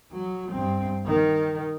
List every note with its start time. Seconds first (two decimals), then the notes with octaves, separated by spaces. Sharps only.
0.12 F#3
0.52 G2 C4
1.05 D#3